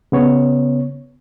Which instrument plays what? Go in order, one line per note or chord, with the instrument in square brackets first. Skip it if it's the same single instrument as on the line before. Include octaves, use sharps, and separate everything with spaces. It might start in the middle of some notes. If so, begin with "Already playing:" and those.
[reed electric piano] C#3 B3 C#5